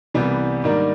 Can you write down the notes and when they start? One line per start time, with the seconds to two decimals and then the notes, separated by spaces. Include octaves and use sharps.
0.14 C2 C3 E3 G3 B3
0.64 G#2 D#3 G3 A#3 D4